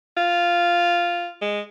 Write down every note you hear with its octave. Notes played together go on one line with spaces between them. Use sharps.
F4
G#3